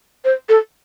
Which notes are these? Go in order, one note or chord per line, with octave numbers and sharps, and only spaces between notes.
C5
A4